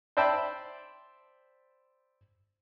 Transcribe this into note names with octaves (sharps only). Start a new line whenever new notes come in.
C5 D5 E5 G5 A5 B5